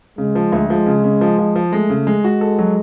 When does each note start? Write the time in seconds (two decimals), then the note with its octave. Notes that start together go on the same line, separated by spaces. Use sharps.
0.18 C#3 G#3
0.35 F3
0.52 D2
0.69 F3 G#3
0.86 C#3
1.04 C#3
1.21 F3
1.38 F3
1.56 F3
1.72 G#3 A3
1.90 C#3
2.07 G#3
2.24 G#3 F#4
2.41 A4
2.59 F#3